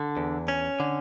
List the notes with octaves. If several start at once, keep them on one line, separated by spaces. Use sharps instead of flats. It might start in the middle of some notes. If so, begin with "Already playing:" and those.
Already playing: D3
E2
C#4
D3